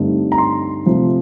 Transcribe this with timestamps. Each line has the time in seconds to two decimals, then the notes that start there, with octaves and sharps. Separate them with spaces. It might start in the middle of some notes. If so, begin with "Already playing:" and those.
Already playing: G2 D3 A3 C4 D#4
0.32 A#5
0.38 C6
0.86 C3 F3 A3